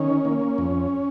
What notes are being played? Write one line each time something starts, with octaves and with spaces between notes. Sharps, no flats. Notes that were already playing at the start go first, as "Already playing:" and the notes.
Already playing: D#3 C#4
A#3
F2